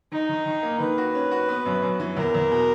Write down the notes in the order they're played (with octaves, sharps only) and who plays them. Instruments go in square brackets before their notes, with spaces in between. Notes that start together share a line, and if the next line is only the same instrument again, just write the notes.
[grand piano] D#3 [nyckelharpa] D#4
[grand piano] D#3
D#3
A#3
[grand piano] D#3 [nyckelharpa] B4
[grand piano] F#4
C#4
F#4
B3
F#2
F#2
E3
[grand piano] E2 [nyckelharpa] A#4
[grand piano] E2
B2